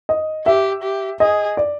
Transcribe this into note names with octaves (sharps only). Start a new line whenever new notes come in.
D#5
G4 E5
G4
G#4 D#5
D5